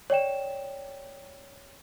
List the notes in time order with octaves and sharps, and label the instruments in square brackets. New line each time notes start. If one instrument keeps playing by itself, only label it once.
[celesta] C#5 D5 G5 E7